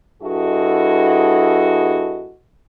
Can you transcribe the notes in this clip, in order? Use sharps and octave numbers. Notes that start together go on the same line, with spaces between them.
G2 E4 F#4 G#4 A4 D#5